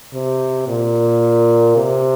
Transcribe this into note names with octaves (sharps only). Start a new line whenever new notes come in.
C3
A#2
C3